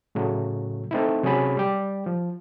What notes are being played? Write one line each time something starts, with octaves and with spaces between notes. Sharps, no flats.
A2 C#3 F#3 A3
A3 C4 D#4 E4
C3 F#3 C#4 G#4 B5
G3 G4
F3